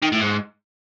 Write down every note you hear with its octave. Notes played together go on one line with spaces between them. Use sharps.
D#3
A2
G#2